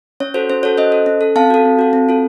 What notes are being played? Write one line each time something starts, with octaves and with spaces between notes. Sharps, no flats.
C#4 C#5
F#4 A4 C5
C#4 C5
F#4 A4 C#5
C#4 C5 D#5
A4
C#4
A4
C4 F5 A5
F#4 A4
C4
F#4 A4
C4
F4 A4